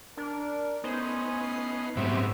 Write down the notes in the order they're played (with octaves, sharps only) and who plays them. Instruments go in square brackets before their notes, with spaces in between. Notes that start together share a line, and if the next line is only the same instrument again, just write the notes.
[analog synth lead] D4 [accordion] A#4
[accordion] A3 C#4 G#5 [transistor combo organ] B3 D#4 [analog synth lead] C5
[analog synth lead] C7
[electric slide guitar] G#2 A3 [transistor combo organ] F#3 B3 C4 [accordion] G4 C#6 [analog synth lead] E5